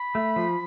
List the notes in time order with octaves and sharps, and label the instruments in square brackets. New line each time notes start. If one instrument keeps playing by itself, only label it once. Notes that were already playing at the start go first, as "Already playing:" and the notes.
Already playing: [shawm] B5
[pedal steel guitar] A3
F3